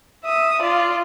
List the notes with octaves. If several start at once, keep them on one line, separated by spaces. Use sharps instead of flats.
E5 D#6
F4 D5